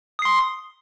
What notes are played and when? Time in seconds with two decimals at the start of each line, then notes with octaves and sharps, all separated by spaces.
0.19 D#6
0.22 C7
0.25 C6